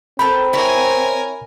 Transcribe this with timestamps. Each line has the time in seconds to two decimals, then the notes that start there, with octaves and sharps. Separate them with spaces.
0.19 C4 A4 A#4 G5 B5
0.53 E4 A#4 C#5 G#5